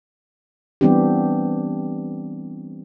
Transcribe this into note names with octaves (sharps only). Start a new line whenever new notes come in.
E3 G3 B3 C4 D4 G4